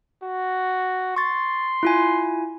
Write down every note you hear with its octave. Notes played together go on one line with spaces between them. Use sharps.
F#4
C6 C#6 A6
E4 F4 G#5